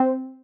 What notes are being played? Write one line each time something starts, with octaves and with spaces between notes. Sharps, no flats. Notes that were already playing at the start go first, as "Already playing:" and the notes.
Already playing: C4